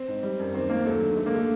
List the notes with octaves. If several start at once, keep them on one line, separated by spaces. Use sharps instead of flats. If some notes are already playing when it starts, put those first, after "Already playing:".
Already playing: C4
G#2
G3
F#2
D#2 C4
D#2 A#3
F#3 A3
D3
D3 A3
A#3
D3 A3